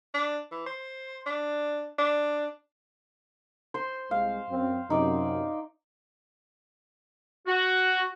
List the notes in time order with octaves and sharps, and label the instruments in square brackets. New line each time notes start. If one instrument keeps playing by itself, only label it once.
[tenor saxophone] D4
E3
C5
D4
D4
[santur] C5 C6
[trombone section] C2 G#3 [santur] F5
[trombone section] F#2 C4
[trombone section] F#2 C3 [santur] D#4 D5
[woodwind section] F#4